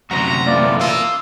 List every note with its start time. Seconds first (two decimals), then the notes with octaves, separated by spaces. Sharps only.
0.11 F#2 C3 F#4 C5 A#5
0.46 A#2 E3 A3 F4 D5
0.80 A#3 F4 D#6 E6